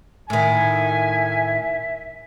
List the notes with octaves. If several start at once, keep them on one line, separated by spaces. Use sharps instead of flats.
A2 D#3 E5 G#5